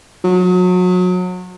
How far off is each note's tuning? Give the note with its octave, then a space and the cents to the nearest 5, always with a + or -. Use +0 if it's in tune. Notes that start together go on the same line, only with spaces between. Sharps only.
F#3 -30